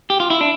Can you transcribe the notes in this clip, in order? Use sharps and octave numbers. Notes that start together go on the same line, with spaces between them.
G4
F4
E4
D4